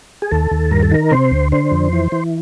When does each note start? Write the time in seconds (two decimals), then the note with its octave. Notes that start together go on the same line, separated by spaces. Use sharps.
0.22 G#4
0.31 D#2 A4
0.51 D#2
0.71 G2 A#4
0.83 A4
0.91 D#3 A#4
1.11 C3 C5
1.31 D2
1.52 D3 C5
1.71 F2
1.93 E3
2.12 E3